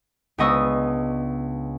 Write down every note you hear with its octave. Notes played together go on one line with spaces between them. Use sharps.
C#2 B3 D4 D#5 C#6 E6